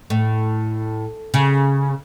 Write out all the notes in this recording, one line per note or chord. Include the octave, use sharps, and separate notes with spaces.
A2
C#3